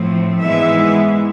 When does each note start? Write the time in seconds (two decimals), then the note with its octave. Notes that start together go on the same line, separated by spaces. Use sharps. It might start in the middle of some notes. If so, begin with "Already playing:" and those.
Already playing: A2 F3 A3 C4
0.41 G#2 E3 G#3 B3 E5